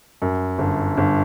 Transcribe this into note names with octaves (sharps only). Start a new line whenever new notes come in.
F#2
G1
G1